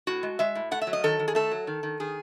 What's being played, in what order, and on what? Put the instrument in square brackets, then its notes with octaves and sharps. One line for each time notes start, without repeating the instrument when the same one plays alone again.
[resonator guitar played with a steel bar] A2 F#4
G#3
G#3 E5
A2
A3 F#5
E5
F#3
D#5
D#3 A4
D#3
G#4
A3 A4
F#3
D#3
D#3
D#3 G#4